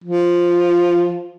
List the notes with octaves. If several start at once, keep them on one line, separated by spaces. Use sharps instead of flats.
F3